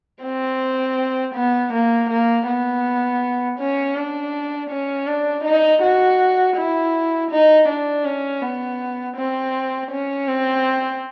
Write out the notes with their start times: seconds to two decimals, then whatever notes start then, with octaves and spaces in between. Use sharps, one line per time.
0.23 C4
1.35 B3
1.73 A#3
2.10 A#3
2.47 B3
3.59 C#4
3.95 D4
4.70 C#4
5.07 D4
5.44 D#4
5.82 F#4
6.56 E4
7.31 D#4
7.68 D4
8.05 C#4
8.42 B3
9.16 C4
9.91 C#4
10.27 C4